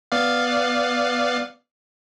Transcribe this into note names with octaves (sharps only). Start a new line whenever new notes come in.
B3 D5 F5